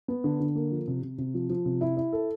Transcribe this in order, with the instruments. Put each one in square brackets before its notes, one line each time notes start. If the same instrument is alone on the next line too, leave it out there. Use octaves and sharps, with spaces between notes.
[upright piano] B3
D3
D3
A#3
F3
C3
C3
C3
F3
F3
C3
E4
E4
A4